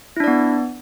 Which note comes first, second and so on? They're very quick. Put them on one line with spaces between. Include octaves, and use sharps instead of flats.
E4 D4 D5 B3